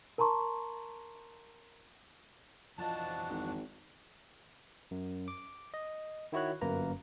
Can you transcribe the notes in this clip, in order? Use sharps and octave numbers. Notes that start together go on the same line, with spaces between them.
A#4 A5 A#5 C6 C#6
F2 E3 F3 D4 F#4 D#5 A5
G#1
F#2
D6
D#5
D#3 E4 F#4 C#5 F#6
G1 F#2 A#3 B4 A#5